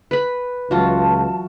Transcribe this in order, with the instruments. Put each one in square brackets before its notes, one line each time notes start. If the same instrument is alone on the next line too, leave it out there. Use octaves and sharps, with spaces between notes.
[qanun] B4 B5
[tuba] C#2 [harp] E3 F#3 [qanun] F4 F#4 [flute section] A5